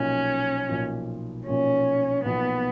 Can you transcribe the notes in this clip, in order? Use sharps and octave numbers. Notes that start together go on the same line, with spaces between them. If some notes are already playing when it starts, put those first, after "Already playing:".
Already playing: B1 A#2 F3 C#4
B1 A#2 F3
B1 A#2 F3 C#4
B1 A#2 F3 B3